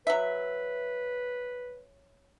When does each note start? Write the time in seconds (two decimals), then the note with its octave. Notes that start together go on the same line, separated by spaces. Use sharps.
0.07 F#3 B4 E5